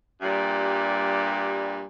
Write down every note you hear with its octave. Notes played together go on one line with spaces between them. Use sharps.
G2 A#2 G3